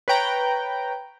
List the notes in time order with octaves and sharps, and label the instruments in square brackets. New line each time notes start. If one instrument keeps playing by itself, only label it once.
[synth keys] B4 C#5 G5 A#5